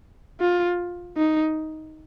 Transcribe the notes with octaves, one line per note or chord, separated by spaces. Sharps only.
F4
D#4